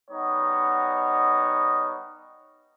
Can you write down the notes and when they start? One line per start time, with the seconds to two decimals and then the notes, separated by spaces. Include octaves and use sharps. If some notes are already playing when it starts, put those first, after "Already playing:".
0.10 G3 B3 D#4 C#5 D#5 F#5